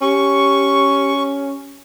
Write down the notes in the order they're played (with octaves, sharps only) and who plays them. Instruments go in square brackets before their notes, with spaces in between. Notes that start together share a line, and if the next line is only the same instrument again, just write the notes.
[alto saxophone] C#4 [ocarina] G4 [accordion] C#6